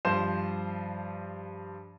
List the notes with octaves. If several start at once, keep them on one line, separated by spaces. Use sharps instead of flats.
G2 F3 C5 E7